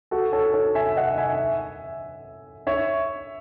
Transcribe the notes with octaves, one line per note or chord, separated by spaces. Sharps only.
F#4 A4
A4 C#5
A4 C#5
E5 G#5
D#5 F#5
E5 G#5
C#5 E5